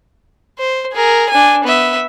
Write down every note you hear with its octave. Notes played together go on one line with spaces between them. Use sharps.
C5
G#4 A#4
D4 G#5
B3 E5